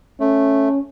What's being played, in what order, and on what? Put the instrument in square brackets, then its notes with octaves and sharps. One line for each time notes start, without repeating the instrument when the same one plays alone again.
[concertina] A3 [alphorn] C#4